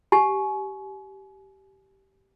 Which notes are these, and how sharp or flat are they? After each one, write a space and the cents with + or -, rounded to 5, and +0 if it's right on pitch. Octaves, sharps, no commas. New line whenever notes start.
G4 -15 G#5 +35